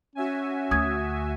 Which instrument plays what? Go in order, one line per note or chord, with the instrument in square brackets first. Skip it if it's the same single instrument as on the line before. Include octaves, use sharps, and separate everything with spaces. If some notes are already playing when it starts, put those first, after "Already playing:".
[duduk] C#4 [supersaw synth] F#4 E5 G#5
[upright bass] D2 [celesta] D#6 G#6